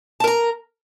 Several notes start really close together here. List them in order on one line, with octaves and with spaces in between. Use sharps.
A5 A#4 A#5